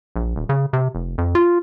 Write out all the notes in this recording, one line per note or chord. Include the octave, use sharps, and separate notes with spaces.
A#1
D#1
C#3
C3
F1
F2
F4